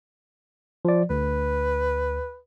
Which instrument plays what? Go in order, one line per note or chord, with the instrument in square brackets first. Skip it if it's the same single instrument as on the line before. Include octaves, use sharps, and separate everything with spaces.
[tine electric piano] F3 D5
[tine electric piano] D2 [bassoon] B4